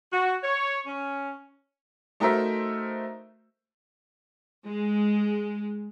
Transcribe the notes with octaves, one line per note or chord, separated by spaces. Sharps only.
F#4
C#5
C#4
A3 D#4 F#4 A#4 C5 E5
G#3